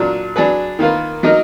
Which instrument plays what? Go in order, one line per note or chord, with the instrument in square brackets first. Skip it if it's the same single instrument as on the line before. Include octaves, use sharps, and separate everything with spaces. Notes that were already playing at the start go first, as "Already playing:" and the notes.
Already playing: [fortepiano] A#2 F#3 D4
F#3 D4 G#4 B4
D#3 A#3 F4 B4
F#3 A#3 D#4 A#4 D#5